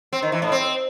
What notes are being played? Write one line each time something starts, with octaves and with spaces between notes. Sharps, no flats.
C4
D#3
E3
A2
C4